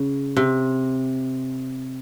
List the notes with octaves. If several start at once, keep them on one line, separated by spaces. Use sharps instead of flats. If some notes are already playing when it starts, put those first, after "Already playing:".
Already playing: C#3
C3